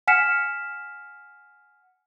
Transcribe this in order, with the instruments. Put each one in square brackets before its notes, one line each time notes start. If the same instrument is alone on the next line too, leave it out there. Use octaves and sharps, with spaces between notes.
[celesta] F#5 G#5 F6 B6 C#7 E7